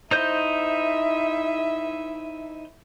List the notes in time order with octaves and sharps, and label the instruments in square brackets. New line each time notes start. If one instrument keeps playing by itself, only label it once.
[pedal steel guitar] D#4 C5 G6 [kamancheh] E4 E5